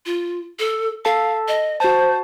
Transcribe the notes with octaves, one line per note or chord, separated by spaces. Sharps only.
F4
A4
A4 F5 A5
D#5
F#4 C5 A5